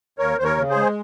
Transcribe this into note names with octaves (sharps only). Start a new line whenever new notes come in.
D#2 A#4 C#5
D#2 C5
A#4 C#5
C#3
G#4 C5
G#3